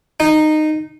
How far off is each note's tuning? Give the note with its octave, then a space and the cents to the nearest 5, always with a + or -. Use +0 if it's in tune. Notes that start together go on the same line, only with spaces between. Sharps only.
D#4 -15